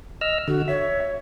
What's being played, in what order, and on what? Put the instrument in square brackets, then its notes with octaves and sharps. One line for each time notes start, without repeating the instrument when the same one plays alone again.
[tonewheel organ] D#5 E6 F6
[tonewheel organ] D3 [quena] F#4
[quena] C#5 [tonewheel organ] E5